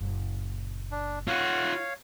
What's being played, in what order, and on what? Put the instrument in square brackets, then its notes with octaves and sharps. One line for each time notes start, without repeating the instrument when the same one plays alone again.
[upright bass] F#1 A#2
[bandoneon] D4
[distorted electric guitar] F4 F#5 [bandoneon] C#5 F5